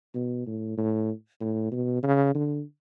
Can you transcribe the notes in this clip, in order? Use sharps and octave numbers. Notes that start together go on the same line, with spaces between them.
B2
A2
A2
A2
B2
C#3
D3